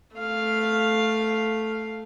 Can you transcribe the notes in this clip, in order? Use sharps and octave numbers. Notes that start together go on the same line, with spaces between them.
A3 F5